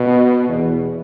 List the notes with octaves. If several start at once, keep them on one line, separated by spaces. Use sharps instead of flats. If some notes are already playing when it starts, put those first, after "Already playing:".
Already playing: B2
E2